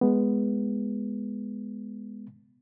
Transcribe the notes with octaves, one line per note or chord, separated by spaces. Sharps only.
G#3 B3